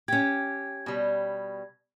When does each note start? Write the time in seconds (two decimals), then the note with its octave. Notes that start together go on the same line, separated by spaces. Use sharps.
0.08 C#4 G4 G#6
0.86 B2 G3